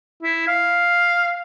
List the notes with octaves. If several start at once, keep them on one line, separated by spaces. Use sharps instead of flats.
E4
F5